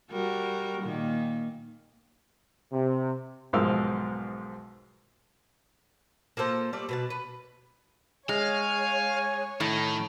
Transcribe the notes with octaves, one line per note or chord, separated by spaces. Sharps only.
G3 F#4 A#4
A#2 D#3 A#3
C3
B1 G#2 F3 A#4 F5 E6
A#3 F4 A4 C5
G3 A3 D5
B2 B4 A5
B4
G#3 C#5 F5 G#5
A2 D#3 D#4